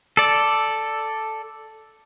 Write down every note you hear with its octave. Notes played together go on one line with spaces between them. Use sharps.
A4 D5